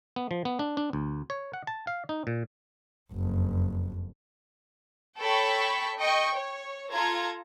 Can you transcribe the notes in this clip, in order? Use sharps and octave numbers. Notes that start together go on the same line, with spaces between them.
B3
F3
B3
D4
D4
D2
C#5
F#5
A5
F5
D#4
A#2
F#1 F2
A4 C#5 G5 B5 C#6 B6
D#5 G5 C#6
C#5
F4 A4 A#5 G#6